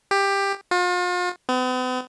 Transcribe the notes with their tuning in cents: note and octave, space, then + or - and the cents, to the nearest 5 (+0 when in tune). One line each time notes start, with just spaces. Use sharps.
G4 +15
F4 +40
B3 +45